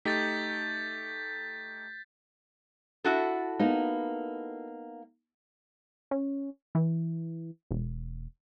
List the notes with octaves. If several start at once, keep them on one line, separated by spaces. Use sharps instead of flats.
A3 D#4 G4 G6 A6 B6
E4 F#4 A4
A#3 B3 D#4
C#4
E3
E1